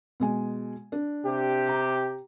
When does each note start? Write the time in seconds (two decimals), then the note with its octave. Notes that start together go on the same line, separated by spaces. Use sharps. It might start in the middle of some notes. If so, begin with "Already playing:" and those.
0.20 B2 G#3 G#5
0.92 D4
1.26 C3 G4
1.69 A#5